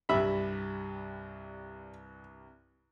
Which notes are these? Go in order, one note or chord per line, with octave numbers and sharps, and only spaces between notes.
C2 G2 G4 E5 B5